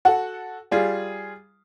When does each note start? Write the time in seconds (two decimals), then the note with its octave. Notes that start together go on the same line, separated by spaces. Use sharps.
0.05 F#4 A4 F#5
0.71 G3 F4 G#4